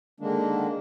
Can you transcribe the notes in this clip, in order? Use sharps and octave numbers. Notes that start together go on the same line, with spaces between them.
D3 D#3 G#3 A#3 D4